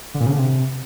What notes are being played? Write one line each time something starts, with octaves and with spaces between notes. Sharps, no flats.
D3
A#2
C#3
D3
C3